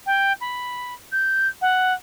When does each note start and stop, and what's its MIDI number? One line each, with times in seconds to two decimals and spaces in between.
0.06 0.33 79
0.41 0.94 83
1.12 1.48 91
1.61 1.93 78